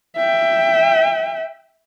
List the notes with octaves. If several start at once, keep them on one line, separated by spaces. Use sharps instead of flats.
E5 G5